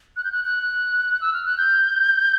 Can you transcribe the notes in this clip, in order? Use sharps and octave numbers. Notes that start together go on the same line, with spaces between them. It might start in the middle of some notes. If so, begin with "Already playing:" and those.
F#6
G6
F#6
F#6
E6
F6
F#6
G6